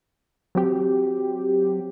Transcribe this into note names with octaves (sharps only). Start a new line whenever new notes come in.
F#3 C4 G4